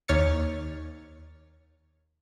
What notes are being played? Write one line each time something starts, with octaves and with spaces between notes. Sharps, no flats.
D#2 C#5 F6 A6 C#7